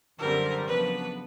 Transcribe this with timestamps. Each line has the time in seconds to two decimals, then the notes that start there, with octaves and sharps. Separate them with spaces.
0.18 F#2 D3 G3 C4 A#4
0.66 F2 C#3 F#3 B3 D4 B4